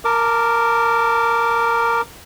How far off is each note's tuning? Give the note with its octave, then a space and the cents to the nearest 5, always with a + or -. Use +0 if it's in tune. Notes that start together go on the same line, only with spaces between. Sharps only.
A#4 -5 A5 +20 D6 +0